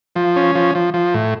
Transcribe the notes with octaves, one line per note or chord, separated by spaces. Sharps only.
F3
C#4
F3
F3
F3
A2